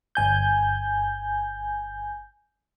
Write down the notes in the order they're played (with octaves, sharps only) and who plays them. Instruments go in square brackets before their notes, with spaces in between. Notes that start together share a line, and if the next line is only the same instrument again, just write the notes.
[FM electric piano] G1 G#5 G6